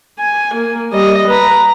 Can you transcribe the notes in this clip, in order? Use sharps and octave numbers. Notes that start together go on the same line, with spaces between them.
G#5
A#3
G3 D#5
B4 A#5